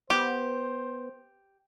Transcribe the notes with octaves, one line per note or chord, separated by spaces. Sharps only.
B3 G4 C5